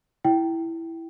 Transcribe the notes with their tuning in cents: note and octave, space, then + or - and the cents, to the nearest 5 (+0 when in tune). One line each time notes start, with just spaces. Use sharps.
E4 +0 G5 -15